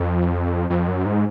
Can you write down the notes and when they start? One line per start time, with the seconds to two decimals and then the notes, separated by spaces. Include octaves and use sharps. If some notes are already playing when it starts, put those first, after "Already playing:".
Already playing: F2
0.70 F2
0.88 F#2
1.05 G#2